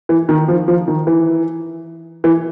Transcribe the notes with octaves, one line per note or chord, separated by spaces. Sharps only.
E3
D#3
F3
F3
D#3
E3
E3